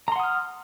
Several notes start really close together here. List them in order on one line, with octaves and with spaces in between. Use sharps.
A#5 C6 F#5 D#6 F6